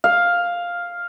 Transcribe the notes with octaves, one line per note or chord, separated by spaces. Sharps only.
F5